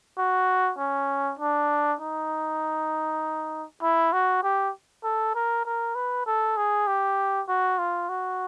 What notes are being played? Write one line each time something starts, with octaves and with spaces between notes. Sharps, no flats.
F#4
C#4
D4
D#4
E4
F#4
G4
A4
A#4
A#4
B4
A4
G#4
G4
F#4
F4
F#4